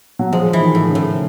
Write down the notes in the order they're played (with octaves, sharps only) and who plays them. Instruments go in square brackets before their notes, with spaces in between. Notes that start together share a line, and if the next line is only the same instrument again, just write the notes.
[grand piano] F#3
[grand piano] F3 [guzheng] G#3
[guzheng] E3
[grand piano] D#3
[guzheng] A2
[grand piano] C#3
[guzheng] A2